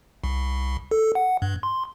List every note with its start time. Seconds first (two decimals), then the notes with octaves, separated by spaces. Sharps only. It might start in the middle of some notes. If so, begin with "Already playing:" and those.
0.24 C2
0.91 A4
1.15 F#5
1.42 G2
1.63 C6